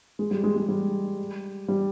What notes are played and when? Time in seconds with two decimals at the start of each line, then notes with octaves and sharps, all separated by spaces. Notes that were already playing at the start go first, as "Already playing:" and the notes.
0.19 G#3
0.31 G3
0.44 G#3
0.56 G#3
0.69 G3
1.68 G3